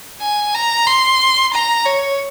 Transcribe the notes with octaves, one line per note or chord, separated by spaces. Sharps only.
G#5
A#5
C6
A#5
C#5